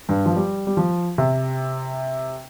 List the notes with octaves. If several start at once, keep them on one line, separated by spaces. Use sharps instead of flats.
G2
F3
G3
G3
F3
C3